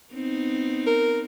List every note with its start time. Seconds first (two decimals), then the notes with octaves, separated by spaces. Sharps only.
0.13 B3 C4 D#4
0.87 A#4